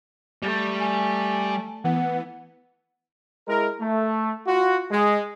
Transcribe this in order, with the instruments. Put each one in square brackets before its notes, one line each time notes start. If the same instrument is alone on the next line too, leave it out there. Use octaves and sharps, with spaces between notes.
[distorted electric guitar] G3 [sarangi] A3
[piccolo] G#5
[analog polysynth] E3 B3 [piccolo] F#5
[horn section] G#3 E4 A#4
A3
F4 F#4
G#3